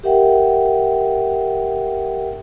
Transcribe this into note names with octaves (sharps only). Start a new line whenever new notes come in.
G4 A#4 E5 F#5 G5